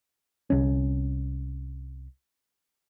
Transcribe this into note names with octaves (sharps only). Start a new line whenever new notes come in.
C2 C#4